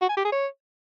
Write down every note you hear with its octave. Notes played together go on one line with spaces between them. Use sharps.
F#4
G#5
G4
G#4
C#5